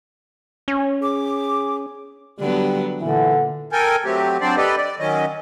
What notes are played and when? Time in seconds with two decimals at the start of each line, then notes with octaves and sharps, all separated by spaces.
0.68 C#4
1.03 G#4 D6
2.40 D3 F#3 G3 B3
3.01 A#2 D3 E3
3.72 A4 A#4 G5 G#5
4.05 F#3 A3 C4 G4
4.41 F#3 C4 D4 C5 D5
4.57 G4 A4 B4 D5 D#5
4.77 D5
4.99 D#3 F#3 C#4 D#5